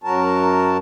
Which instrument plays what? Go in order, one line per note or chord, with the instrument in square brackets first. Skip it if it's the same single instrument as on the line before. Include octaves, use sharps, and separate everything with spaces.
[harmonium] F#2 F#3 F#4 A#4 A5